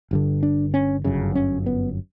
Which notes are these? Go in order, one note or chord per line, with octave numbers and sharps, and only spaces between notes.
G1 G2 D3
D4
C#4
G1 F#2 C#3
C#4
B3